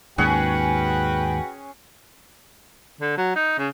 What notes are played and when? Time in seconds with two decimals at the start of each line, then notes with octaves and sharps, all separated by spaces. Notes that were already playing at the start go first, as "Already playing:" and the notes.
0.18 D#2 G#2 C#4 F#4 G#4 B4 F#5 G5
3.01 D3
3.17 F#3
3.36 D#4
3.58 C#3